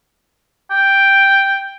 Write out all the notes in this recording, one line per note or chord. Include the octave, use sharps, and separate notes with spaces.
G5